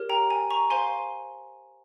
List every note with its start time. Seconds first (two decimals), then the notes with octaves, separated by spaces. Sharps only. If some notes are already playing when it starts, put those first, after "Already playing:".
Already playing: G4 A#4 C#5
0.09 G5 A#5
0.30 G#5
0.50 A#5 C#6
0.70 C5 F5 G#5 C6